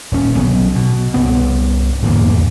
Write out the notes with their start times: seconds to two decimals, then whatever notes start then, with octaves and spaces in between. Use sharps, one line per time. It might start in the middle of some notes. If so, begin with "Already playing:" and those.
0.12 D#1 C#4
0.36 B1 F#3 B3
0.76 B2
1.14 C2 G2 B3
2.02 D1 E2 G#2 A#3
2.32 E2